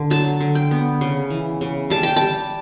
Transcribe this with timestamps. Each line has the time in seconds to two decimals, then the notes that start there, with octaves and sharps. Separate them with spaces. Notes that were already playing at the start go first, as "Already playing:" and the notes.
Already playing: D3
0.10 F#3 A5
0.40 D3
0.55 G5
0.71 B3
1.01 C#3
1.30 E3
1.61 C#3
1.90 G3 A5
2.03 G5
2.16 G3 A5